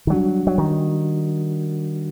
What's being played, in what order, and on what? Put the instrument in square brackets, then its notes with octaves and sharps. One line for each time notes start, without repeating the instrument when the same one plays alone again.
[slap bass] D#3
[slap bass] F#3 [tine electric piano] G3 D4 F#4
[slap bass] F#3
D#3